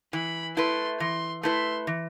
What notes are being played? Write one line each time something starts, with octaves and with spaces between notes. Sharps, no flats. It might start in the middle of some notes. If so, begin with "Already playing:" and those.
E3 B5
A3 E4 B4 C6
E3 C6
A3 E4 B4 C6
E3